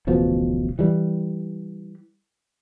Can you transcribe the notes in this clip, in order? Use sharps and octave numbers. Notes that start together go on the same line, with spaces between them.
D1 A1 B2 F3
E3 G3